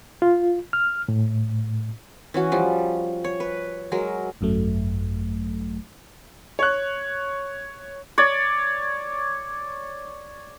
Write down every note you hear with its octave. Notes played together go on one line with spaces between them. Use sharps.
F4
F6
A2
E3 C#4 F#4
F3 G3
C#5
B4
F#3 G#3 A#4
G#1 F#2 F#3 A3
C#5 F#6
C#5 D5